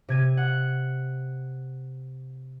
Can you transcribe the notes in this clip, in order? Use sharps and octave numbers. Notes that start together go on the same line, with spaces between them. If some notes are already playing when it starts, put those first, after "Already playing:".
C3 G#6 D#7
F#5